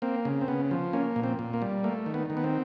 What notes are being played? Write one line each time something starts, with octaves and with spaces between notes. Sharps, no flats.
A#3 C4
C#3
C4
C#3 B3
F3
A#3 C#4
A#2
C4
A#2
A#3
G3
A3 A#3
D#3
B3
D#3
B3
C4